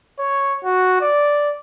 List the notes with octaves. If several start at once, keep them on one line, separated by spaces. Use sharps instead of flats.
C#5
F#4
D5